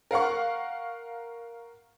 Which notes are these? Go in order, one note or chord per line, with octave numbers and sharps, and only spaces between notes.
A#4 F5 F#5 C#6